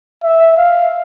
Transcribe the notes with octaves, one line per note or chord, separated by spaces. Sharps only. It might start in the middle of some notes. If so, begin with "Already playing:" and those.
E5
F5